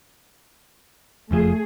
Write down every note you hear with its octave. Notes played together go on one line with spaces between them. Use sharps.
F#1 F2 F3 A3 G#4